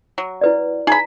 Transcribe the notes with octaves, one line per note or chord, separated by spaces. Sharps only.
F#3
E4 B4 D5
D#4 G#4 A#5 B5